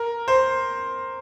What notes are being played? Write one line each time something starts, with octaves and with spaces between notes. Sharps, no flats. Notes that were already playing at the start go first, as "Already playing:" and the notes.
Already playing: A#4
C5